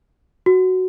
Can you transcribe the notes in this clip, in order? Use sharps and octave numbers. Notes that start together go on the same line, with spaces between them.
F#4